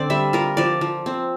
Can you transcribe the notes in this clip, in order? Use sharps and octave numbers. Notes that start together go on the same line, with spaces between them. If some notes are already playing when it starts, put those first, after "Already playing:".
Already playing: D3 C4 C5 D5
G3 E5
F4 A#4
F3 D5
F3
C4